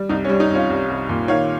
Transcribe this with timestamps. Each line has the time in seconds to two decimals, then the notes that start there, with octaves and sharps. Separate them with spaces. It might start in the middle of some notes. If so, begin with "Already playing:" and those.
Already playing: G3
0.09 C2 D#4
0.25 C#4
0.29 G3
0.40 D#4
0.50 C2 C#4 F4
0.70 C2
0.90 C2
1.09 A#2
1.28 D#3 C#5 F5